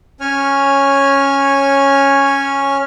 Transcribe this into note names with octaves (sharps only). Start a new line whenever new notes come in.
C#4 C#5 G#5 F6